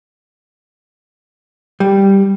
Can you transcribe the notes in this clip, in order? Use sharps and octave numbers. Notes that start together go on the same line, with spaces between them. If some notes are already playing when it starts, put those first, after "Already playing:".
G3